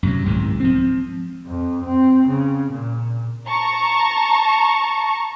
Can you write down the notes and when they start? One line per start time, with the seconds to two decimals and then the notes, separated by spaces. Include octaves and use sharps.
0.03 F#2 C3 F#3
0.25 C2 G#2 C3 D#3
0.60 F3 C4
1.46 F2
1.83 C4
2.28 C#3
2.71 A#2
3.47 A5 A#5 C#6